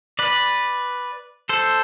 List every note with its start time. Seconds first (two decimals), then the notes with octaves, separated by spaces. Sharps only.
0.19 B4 D5
1.49 A4 C5